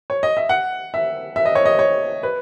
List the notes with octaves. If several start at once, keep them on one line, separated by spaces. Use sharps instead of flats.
C#5
D#5
E5
F#5
E5
E5
D#5
C#5
D#5
C#5
B4